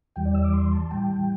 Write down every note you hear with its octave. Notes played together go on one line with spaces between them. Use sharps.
E2 E3 G3 G5
D5
E6
D6
C6
A5
A2 E3 G3 G5